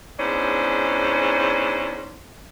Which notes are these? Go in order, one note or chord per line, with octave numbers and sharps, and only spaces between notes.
E2 G#2 C#4 D4 C5